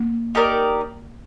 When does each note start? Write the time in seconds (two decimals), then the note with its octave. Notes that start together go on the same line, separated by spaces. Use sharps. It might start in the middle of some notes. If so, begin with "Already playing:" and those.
Already playing: A#3
0.35 D#4 G4 A#4 D5